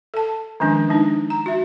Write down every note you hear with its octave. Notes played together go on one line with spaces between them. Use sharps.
A4 A5
D#3 F3 G#3 C#4 D4
G#3 D4 D#4
A#5
F#4 E5